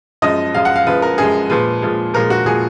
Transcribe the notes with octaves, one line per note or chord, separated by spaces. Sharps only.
F#2 F3 G#3 D#5
F#2 F3 G#3 F5
F#5
F5
F#2 F3 G#3 B4
A#4
F#2 F3 G#3 G#4
A#2 F3 G#3 B4
A#2 F3 G#3
A#2 F3 G#3 A#4
F#4
A#2 F3 G#3 G#4